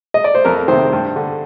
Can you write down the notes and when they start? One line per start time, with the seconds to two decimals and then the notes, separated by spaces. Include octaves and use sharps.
0.14 D#5
0.24 D5
0.35 C5
0.45 F2 A#4
0.68 C3 D#3 C5
0.93 G2
1.16 D3